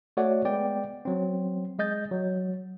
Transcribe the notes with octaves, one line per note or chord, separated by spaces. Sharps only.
A3 F#4 C#5 D5 F#5
G#3 B3 D5 G5
F#3 C4
G#3 D#5 G6 A6
F#3